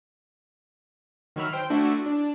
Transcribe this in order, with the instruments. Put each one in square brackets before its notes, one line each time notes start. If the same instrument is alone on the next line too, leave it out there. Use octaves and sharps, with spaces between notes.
[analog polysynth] D#3 F#3 E5 B5 F6
C5 G5 C6
A3 D4 E4 F#4
D4